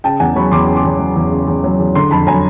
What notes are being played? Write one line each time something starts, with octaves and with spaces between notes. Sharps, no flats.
C#3 G5 A5
E2 F#5 G#5
F#3 B5 C#6
E2 C6 D6
C#3
C6 D6
E2
F#3
E2
C#3
E2
F#3
E2
D3 A#5 C6
F2 A5 B5
F#3 G#5 A#5